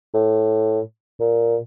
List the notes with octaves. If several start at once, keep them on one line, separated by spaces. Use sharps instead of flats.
A2
A#2